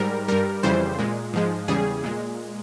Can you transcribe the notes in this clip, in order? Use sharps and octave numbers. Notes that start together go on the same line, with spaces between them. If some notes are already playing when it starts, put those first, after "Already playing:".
Already playing: G#2 G3 A#4
G2 G3 A#4
F2 C#3 E3 G3 C5
A#2 G#3
G#2 F3 G#3
E2 C#3 G3 G#4
A#2 G#3